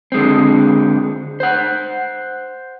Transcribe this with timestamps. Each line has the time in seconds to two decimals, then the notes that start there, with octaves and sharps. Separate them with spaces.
0.12 D3 G#3 C4
1.40 C5 F#5